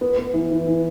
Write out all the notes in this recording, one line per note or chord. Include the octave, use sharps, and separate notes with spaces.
B3
B3
E3
E3
E3